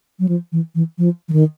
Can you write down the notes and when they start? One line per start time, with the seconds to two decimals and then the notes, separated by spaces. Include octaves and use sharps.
0.19 F#3
0.29 F3
0.52 E3
0.75 E3
0.98 F3
1.29 E3
1.33 D#3